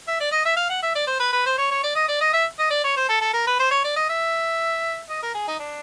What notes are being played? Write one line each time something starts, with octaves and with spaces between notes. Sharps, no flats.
E5
D5
D#5
E5
F5
F#5
E5
D5
C5
B4
B4
C5
C#5
C#5
D5
D#5
D5
D#5
E5
D#5
D5
C#5
C5
A4
A4
A#4
B4
C5
C#5
D5
D#5
E5
D#5
A#4
G#4
D#4
D4